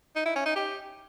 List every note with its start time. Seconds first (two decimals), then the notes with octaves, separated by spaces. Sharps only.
0.16 D#4
0.26 E4
0.36 C#4
0.46 D#4
0.56 G4